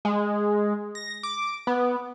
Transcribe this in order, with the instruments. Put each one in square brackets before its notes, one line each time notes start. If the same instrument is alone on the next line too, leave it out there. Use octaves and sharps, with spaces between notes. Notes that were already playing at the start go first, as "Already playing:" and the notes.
[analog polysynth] G#3
A#6
D6
B3